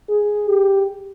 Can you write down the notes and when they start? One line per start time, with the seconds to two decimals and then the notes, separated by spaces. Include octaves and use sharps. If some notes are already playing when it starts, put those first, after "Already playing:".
0.09 G#4
0.49 G4